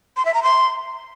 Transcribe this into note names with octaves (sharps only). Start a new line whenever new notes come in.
C6
E5
A#5
C6